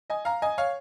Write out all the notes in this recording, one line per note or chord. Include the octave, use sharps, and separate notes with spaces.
D#5 G#5
F5 A#5
D#5 G#5
C#5 F5